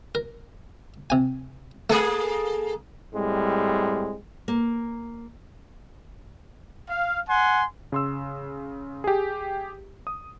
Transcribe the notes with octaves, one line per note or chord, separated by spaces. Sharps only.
A#4
C3 G#5
A3 A#3 G#4 A4
A2 G3 G#3 C4
A#3
F5
F#5 G#5 C6
C#3 C6 E6
G4 G#4
D#6